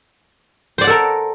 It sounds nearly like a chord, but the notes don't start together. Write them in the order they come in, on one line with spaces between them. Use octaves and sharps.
C5 D5 F#5 A4 A#4